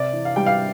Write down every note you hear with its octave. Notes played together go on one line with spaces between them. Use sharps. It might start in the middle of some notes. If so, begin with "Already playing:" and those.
Already playing: C3 D5
E3
F5
G3 G5
F5